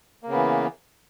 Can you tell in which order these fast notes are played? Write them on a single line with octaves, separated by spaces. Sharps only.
A#3 C#3 B3 E3